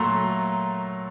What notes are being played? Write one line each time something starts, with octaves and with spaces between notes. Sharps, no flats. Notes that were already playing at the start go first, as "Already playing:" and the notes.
Already playing: A#2 F#3 A3 A#5 C6